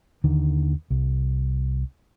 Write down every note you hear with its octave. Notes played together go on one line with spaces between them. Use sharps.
D#2 D3 D#3
C2